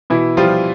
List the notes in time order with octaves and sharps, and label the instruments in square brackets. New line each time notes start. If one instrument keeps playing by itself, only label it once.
[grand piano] B2 E3 E4
F3 G3 F4